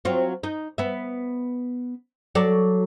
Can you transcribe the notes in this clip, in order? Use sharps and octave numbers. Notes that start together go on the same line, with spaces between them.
F#3 C4 F4
D#4
B3 E5
F#3 A4 D5